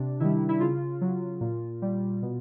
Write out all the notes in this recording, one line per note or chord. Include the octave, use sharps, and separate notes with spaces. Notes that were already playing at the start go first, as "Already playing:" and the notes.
Already playing: C3 D4
D#3 G3 E4
E4
C#3 F4
F#3
A#2
G3
B2